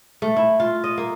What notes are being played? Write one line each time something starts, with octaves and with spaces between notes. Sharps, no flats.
A3
E4
F4
D#5
A#3